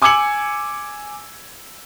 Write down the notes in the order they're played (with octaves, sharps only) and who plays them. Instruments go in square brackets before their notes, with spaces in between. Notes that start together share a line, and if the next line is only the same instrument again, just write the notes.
[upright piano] G#5 D6 E6 G#6 C#7 F#7